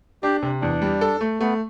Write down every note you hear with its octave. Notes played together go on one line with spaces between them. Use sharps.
D4 G4
C3
E2 D4
G3
A4
A3
A3 B3